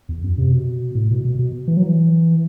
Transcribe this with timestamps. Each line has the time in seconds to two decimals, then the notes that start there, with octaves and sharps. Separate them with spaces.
0.09 E2
0.24 F#2
0.38 C3
0.52 B2
0.95 A2
1.11 B2
1.25 B2
1.39 B2
1.68 E3
1.77 F#3
1.83 E3